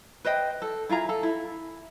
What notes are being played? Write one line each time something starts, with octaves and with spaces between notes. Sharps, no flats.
B4 C5 D#5 G5
A4
E4 F4 G#4 A#5
A4
E4